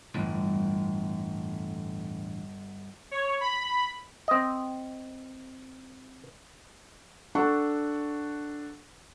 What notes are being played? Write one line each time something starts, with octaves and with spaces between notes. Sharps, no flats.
G1 E2 A2 D3
C#5
B5
C4 D#5
D4 A4 F#5 C#6